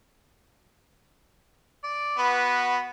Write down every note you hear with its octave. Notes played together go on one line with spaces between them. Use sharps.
D5
B3 F#4 B4